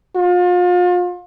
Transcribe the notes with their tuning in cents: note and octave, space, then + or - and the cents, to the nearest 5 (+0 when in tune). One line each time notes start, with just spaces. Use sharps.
F4 +35